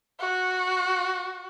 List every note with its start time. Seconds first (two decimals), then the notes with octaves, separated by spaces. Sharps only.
0.20 F#4